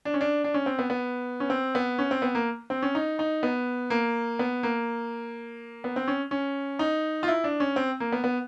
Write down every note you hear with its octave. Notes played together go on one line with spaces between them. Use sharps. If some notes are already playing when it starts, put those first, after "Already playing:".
D4
C#4
D4
D4
C#4
C4
B3
B3
C#4
C4
B3
C#4
C4
B3
A#3
C4
C#4
D#4
D#4
B3
A#3
B3
A#3
B3
C4
C#4
C#4
D#4
F4
E4
D4
C#4
C4
A#3
B3
B3